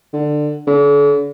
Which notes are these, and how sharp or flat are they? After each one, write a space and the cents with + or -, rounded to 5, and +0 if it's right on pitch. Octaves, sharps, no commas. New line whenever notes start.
D3 +20
D3 -45